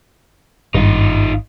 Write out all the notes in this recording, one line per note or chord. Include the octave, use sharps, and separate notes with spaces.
G#1 G2 D#4 F4